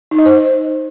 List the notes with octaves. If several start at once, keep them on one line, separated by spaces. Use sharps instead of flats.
D#4
D#5
C5